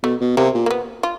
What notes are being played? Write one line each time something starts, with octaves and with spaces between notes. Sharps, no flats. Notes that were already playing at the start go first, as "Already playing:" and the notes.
B2 A3
B2
C3 A#3
A#2
A#3
B3
F4